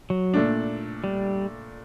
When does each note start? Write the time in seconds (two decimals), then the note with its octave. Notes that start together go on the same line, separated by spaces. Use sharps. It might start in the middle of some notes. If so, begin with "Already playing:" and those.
0.10 F#3
0.34 A#2 A3 D4
1.04 G3